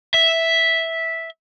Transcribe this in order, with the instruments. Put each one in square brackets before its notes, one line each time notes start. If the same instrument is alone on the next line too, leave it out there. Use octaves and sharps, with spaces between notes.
[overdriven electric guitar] E5